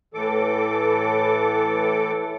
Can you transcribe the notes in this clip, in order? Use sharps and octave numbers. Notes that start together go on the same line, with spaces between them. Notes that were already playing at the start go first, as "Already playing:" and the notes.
A2 E3 A4 D6